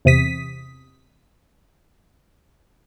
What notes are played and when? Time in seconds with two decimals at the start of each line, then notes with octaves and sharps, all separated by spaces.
0.05 E2 C3 D#6 B6